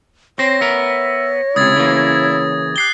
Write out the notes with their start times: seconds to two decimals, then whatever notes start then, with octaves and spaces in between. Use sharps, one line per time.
0.39 C4 C5 C#5 A#6
0.61 B3 A#4 E5
1.56 C#2 C3 E4 D#6 G#6 A6
1.76 C#3 E3 A#3
2.76 G4 F#6 C7 G7